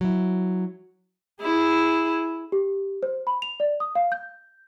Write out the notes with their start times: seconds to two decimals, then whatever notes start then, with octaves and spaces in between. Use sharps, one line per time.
0.01 F#3 E4
1.41 E4 G#4
2.52 G4
3.03 C5
3.27 B5
3.42 F7
3.60 D5
3.80 D#6
3.95 F5
4.12 G6